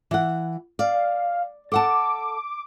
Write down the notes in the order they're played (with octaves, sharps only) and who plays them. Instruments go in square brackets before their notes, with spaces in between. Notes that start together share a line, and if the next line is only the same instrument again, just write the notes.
[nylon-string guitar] E3 F#5
[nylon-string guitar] D5 [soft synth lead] F5
[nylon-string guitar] A4 F#5 A5 [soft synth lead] D6